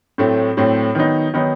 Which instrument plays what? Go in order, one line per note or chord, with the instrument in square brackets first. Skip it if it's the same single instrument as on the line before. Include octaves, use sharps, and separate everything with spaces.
[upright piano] A2 F#3 A3 C4
A2 F#3 A3 C4
D#3 F#3 B3 D#4
D#3 F#3 B3 D#4